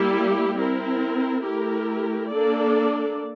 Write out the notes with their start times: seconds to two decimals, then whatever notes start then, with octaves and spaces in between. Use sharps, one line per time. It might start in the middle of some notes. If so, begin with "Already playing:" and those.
Already playing: G3 A#3 E4 G4
0.58 C4 E4 A#4
1.44 A3 E4 G4 A#4
2.30 A#3 D4 A4 D5